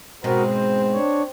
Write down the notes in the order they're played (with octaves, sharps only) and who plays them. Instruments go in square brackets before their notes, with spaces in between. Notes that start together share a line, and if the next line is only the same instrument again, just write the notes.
[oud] G#2 B2 G#3 [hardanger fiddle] C4 [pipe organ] F#4 A#4
[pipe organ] C5
D4 C#5